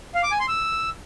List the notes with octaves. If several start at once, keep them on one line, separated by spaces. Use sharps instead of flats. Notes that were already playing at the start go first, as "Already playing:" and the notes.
F5
D6
G#5
C6
E6